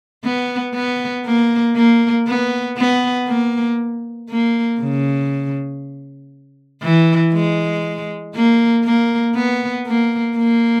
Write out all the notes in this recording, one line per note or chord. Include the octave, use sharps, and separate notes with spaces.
B3
B3
A#3
A#3
B3
B3
A#3
A#3
C#3
E3
G#3
A#3
A#3
B3
A#3
A#3